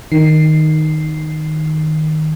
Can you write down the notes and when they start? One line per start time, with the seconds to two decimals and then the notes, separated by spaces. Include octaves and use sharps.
0.12 D#3 C7